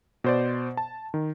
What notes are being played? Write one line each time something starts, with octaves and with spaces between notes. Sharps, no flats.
B2 C5 D5
A5
D#3